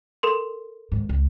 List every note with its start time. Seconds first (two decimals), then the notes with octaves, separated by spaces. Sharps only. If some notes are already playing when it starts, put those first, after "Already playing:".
0.23 A4 A#4 C6
0.92 D#2 G#2
1.09 C#2